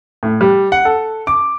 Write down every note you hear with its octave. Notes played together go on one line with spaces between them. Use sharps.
A2
G3
F#5
A4
D6